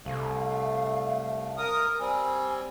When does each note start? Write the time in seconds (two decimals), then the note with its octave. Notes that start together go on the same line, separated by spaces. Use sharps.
0.05 C2 A3 F5
1.57 A#4 D#6
2.00 G3 C4 G#5